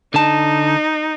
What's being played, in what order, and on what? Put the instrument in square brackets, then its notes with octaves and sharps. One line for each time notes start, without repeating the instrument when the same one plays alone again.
[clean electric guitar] D3 A5 [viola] D#4